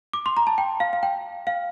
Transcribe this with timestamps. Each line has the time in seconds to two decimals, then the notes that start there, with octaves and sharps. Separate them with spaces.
0.13 D6
0.26 C6
0.37 A#5
0.47 A5
0.58 G5
0.80 F5
0.93 F5
1.03 G5
1.47 F5